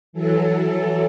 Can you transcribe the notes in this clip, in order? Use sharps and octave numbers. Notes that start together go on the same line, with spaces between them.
E3 F#3 A4